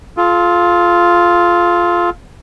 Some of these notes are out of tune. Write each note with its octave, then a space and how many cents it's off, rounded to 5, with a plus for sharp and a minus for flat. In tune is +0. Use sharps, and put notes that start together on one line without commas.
F4 +0 A4 -40